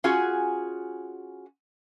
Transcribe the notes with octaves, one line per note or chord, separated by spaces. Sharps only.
C#4 F4 F#4 G#4 F#5 G#5